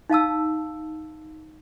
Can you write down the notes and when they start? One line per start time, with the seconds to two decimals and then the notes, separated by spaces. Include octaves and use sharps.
0.10 D#4 F5 A5 E6